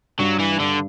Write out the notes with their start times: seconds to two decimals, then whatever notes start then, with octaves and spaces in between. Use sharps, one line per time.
0.19 G2 F#3
0.39 E3
0.59 G2 D3